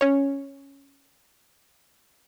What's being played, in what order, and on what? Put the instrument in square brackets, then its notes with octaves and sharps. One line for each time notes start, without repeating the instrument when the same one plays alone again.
[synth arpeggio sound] C#4 C#5